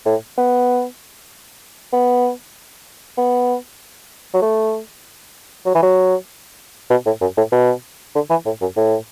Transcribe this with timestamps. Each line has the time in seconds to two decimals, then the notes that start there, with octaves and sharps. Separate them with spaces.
0.05 A2
0.38 B3
1.93 B3
3.17 B3
4.34 F#3
4.42 A3
5.66 F#3
5.74 E3
5.82 F#3
6.90 B2
7.06 A2
7.21 F#2
7.37 A2
7.52 B2
8.15 D3
8.30 E3
8.46 A2
8.61 F#2
8.76 A2